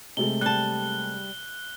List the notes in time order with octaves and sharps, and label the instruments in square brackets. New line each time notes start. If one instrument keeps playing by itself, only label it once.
[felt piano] C3 G#3 A3 [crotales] G7
[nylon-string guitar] G3 A5 [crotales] F#6